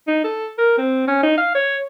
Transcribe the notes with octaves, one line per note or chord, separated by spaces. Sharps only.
D#4
A4
A#4
C4
C#4
D#4
F5
C#5